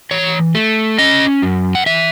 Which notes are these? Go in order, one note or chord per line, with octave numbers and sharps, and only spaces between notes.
E3 C#5
A3
C#4 D#5
F#2
F#5
E3 E5